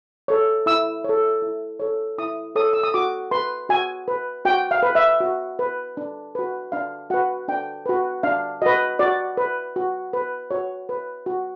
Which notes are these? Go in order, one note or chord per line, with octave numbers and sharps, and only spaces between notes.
A4 C#5
E4 E6
A4 C#5
E4
A4 C#5
E4 D#6
A4 C#5 D#6
E6
D#6
F#4 D6
B4 C6
F#4 G#5
B4
F#4 G5
F5
B4
E5
F#4
B4
D4
F#4 B4
D4 F5
F#4 B4 F#5
D4 G5
F#4 B4
D4 F5
F#4 B4 D#5
F#4 D5
B4
F#4
B4
F#4 C#5
B4
F#4